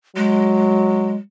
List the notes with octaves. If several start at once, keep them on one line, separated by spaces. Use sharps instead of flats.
F#3 G#3